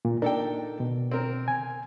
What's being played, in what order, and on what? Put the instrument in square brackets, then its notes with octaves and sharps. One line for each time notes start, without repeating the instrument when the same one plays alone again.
[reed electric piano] A#2
[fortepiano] D4 A4 G5 [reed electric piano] D#4 A#4
[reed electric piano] B2
[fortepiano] C4 A#4
[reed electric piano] G#5